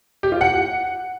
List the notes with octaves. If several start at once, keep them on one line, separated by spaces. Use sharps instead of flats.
G4
F4
F#5